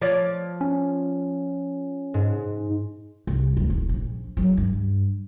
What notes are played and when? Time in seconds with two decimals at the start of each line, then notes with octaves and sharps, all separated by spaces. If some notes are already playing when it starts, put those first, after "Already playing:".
0.01 F3 C#5 D5
0.61 C#4
2.14 G#2
3.27 C2
3.57 D2
3.70 D#1
3.89 A#1
4.37 F#3
4.57 G2